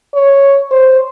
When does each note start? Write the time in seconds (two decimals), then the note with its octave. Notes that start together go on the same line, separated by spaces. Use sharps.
0.14 C#5
0.71 C5